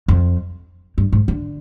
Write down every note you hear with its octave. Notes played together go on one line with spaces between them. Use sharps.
F2
G2
G#2
D3